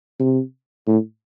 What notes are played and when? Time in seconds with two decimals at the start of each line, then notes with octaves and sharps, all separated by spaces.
0.20 C3
0.87 A2